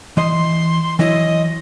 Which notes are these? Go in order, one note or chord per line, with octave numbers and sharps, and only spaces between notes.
E3 D#5 C6
E3 F#3 E4 D#5